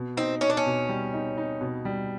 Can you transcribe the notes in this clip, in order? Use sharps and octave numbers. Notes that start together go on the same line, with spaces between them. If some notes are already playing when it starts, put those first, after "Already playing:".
Already playing: B2
C4 D#4
C#4 D#4
D4
C#4
B2
G3
D#4
D#4
B2
G3